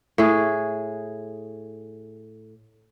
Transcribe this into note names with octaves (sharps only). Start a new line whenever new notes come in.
A2 G#4